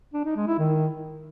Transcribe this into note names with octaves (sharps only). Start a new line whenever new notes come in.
D4
D#4
G#3
E4
D#3